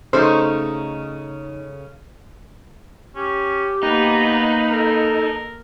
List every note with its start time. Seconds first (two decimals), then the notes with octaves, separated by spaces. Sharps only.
0.13 C#3 A3 D#4 C5
3.15 C#4 G4
3.83 A#3 B3 D#4 B4
4.71 A4 A#4